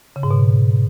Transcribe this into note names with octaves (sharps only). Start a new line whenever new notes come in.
C#3
G#2
B2